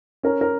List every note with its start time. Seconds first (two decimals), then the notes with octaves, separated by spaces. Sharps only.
0.23 C#4 A#4
0.41 A#4